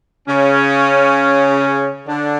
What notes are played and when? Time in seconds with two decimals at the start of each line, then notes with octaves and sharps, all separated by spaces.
0.28 C#3 C#4
2.08 D3 D4